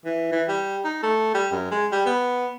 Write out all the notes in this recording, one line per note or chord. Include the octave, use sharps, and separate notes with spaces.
E3
E3
G3
D#4
A3
G3
F#2
G#3
G3
B3